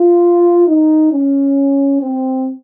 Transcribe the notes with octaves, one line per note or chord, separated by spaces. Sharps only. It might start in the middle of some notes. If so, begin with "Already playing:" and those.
Already playing: F4
D#4
C#4
C4